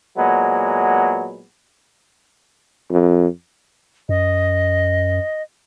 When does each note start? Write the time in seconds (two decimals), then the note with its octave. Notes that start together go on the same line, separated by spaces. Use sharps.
0.17 A#2 F#3 G#3 B3
2.91 F2
4.09 F#2 D#5